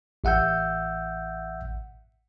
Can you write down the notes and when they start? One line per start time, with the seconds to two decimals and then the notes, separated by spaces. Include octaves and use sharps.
0.24 A1 E5 F#5 E6 G6